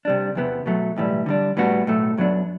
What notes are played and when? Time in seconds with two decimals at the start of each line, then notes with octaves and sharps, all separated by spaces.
0.05 C3 G3 D4
0.35 E2 C3 E3 B3
0.66 B2 F#3 A3
0.96 B1 A2 E3 G3
1.26 D3 G3 D4
1.57 A2 G3 B3 D4 F#4
1.87 B1 A2 F#3 A3
2.17 F#2 F#3 B3 D4